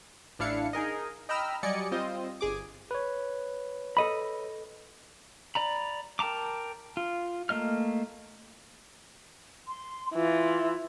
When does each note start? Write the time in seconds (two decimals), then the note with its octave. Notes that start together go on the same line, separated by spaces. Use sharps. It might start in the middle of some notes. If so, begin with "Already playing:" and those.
0.39 A1 D4 E4 F5 C#7
0.73 D#4 G#4 A#4 D#5
1.29 D#5 G5 A#5 B5 E6 F6
1.63 F#3 G3 D5 D#5 G#5 C#7
1.91 G3 C4 F4 C5 D#5
2.41 G1 G#4 D6
2.91 B4 C#5
3.97 A4 D#5 B5
5.55 D5 A#5 B5
6.19 A#4 G5 A5 A#5 D6
6.97 F4
7.49 A3 A#3 D#5 F6
9.69 C6
10.14 E3 F4